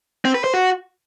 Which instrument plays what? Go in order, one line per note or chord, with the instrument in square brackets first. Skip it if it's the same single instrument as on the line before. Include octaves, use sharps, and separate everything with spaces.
[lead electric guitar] C4
B4
C5
F#4